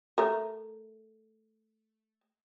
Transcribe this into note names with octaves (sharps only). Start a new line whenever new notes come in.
A3 A#4